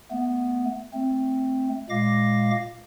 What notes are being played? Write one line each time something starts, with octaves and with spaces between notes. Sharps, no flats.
A3 B3
A3 C4
A#2 G#3 F5 D6 A#6